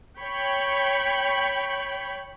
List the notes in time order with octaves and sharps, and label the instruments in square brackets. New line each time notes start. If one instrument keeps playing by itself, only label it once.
[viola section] C#5 G5 B5